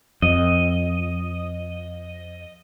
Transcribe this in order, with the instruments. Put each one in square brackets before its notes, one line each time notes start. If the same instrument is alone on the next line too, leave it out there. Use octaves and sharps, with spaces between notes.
[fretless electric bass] F2 [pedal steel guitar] D#5